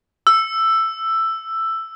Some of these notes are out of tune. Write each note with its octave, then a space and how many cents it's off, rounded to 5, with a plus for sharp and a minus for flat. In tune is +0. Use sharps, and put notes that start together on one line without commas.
E6 +10